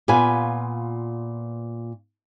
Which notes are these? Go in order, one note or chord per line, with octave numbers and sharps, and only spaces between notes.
A#2 B3 F4 B4 G#5